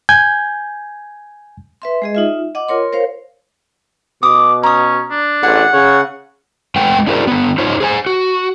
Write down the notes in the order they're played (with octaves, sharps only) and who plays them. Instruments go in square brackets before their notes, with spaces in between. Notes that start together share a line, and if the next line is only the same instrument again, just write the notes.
[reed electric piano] G#5 G6 G#6
[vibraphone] B4 E5 C6
G#3 G#4 D#5
D#4 F4 E5
D#5 F#5 D6
F4 A#4 C#5 C6
A#4 C5 C#5 F5
[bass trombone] B2 [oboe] D6 [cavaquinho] D#6
[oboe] C#4 [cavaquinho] A#5 D#6
[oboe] D4
[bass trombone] A1 [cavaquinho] G#4 [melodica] F#5
[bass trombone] C#3 [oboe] C#5
[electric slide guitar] A2 G#3 B4 F#5 G5
D4 E4 F#4 G#4 A#4 C5
D3 B3
D#4 F4 C5 C#5
G#4 C5 G#5
F#4